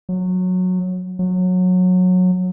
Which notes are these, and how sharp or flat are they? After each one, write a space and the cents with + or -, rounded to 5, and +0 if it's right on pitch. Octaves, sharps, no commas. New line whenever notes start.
F#3 -15
F#3 -20